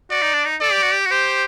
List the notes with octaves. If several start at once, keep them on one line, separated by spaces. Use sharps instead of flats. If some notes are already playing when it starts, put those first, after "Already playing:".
F#4 D5
D#4
D4
D#4
A4 D5
G4
F#4
G4
F#4
G4 C5